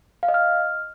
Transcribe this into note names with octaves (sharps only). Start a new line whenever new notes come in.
F5
D#5
F6